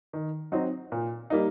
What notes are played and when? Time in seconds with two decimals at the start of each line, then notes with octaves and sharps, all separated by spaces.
0.13 D#3
0.52 F#3 C4 D#4
0.92 A#2
1.30 G3 A#3 D#4